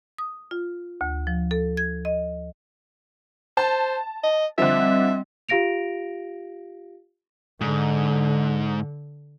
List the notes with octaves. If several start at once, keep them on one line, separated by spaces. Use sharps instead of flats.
D#6
F4
D2
F3
A4
G#6
D#5
C5 A5
D#5
D3 F3 G3 C4 D#5 E5
F4 G4 F5 A#6 D7 F7
G#2 D3